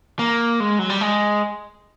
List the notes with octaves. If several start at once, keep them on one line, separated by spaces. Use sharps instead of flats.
A#3
G#3
F#3
G3
G#3